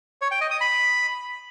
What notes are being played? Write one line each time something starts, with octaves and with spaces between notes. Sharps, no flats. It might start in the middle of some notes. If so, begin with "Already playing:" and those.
C#5
G5
D#5
D#6
B5